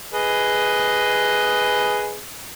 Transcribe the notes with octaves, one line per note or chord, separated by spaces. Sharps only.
G#4 B4 D#5